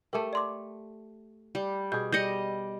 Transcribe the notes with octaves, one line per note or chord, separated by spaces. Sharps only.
A3 G4 A#4 A5
D5 C6 D6
G3
B2 G#4 G6
G3 D#5 G6 A#6 C#7